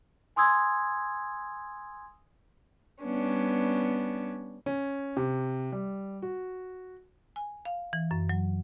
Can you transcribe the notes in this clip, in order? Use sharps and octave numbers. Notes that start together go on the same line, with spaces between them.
G#5 C6 D#6 E6 G#6
G3 B3 C#4 D4
C#4
C3
G3
F#4
G#5
F5
E3
F#2
F#3